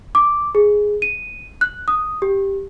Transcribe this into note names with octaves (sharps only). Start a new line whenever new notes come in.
D6
G#4
D#7
F#6
D#6
G4